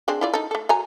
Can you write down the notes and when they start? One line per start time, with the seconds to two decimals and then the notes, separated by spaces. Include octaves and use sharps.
0.08 G#3 C4 D4
0.21 E4 F4 D5
0.34 D#4 A4
0.51 A3 A4
0.69 F#3 G#5 A#5